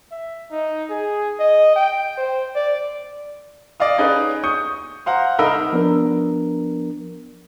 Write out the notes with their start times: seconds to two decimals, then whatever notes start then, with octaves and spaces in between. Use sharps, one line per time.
0.11 E5
0.51 D#4
0.90 G#4
1.39 D#5
1.76 G5
2.17 C5
2.55 D5
3.80 D5 D#5 F5 D#6
3.98 C#4 D#4 G#4 B4 D5
4.44 C#6 D#6 G6 C#7
5.06 C5 F5 F#5 A#5
5.38 C2 D#4 A#4 E5 B5 E6
5.72 F3 B3 D4 A#4